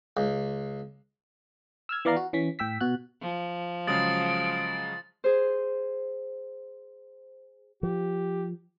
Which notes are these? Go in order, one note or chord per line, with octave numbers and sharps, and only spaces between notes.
C#2
E6 F6 G#6
E3 B3 D5 F5 A#5 C7
F#4
E3 C#4 B6
A2 G5 E6 B6
B2 F#4 F#6
F3
C#3 F#3 G#3 D#6 A6 D7
G#4 C5
F3 G4